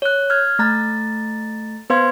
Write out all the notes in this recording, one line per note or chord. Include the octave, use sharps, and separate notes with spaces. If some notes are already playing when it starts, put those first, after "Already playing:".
C#5 F#6
F6 G#6
A3 A#5 A6
B3 B4 C5 F5 C6 G#6